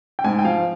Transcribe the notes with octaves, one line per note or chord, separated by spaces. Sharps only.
G5
G#2 G#5
G5
F3 F5